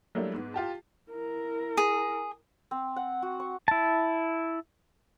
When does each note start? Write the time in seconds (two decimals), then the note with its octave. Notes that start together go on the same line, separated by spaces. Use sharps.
0.15 F#3 G3 A3 A#3 D4 E4
0.33 G#2 B3
0.54 F4 G4 A5
1.11 E4 A#4
1.77 G#4
2.71 C4
2.96 F#5
3.22 F#4
3.40 C#6
3.68 E4 A5